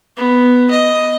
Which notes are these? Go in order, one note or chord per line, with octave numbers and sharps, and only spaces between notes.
B3
D#5